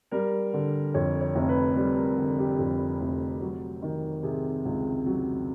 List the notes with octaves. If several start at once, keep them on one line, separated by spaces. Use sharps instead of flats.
G3 A#4
D3
F2 C#5
C#5
F1
B4
G3 B4
A#4
D3
G4
F2
F1
F#3
D#3
C3 G#4
C#2
F#3